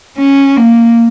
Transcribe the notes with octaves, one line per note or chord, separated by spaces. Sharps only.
C#4
A#3